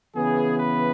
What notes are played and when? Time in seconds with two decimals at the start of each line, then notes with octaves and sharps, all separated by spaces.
0.15 C#3 E3 B3 G#4
0.57 B4